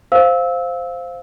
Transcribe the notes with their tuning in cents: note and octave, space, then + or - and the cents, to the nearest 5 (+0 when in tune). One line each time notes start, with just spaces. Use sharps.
C5 +0 F5 +0 E6 -20